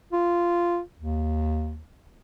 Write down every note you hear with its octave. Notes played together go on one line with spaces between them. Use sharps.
F4
D#2